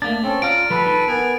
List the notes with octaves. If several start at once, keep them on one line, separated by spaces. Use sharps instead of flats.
A3 A#3 D4 A6
C4 C#4 A4
F4 D5 F5 A#5 D7
F3 G3 A4 B4 B5
D#4
B3 A#4 G#5